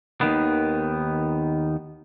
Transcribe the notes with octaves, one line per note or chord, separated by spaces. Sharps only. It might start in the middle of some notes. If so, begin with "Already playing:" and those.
D#2 G#2 D#3 B3